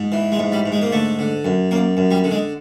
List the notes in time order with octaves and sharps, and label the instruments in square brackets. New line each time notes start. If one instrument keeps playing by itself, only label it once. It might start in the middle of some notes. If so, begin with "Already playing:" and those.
Already playing: [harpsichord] G#2
E3
G#3
G#2
G3
G#2
G#3
A#3
D3 A3
D3
F#2
F#2 A#3
F#2
G3
D3
G#3